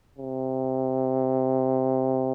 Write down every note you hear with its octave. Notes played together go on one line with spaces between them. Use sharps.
C3